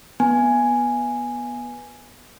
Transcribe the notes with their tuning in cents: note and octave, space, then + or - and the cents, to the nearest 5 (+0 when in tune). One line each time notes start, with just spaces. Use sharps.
B3 -15 G#5 +0